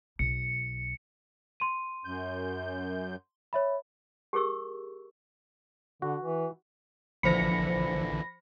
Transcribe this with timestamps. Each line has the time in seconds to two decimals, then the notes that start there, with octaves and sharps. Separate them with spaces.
0.19 B1 C#7
1.60 C6 D#7
2.05 F#2 G6
3.53 C#5 E5 B5
4.33 G4 G#4 A#4 C#6 E6
6.02 D3 F#4
6.21 E3
7.23 A#1 D3 E3 F3 C5 B5 A#6 C#7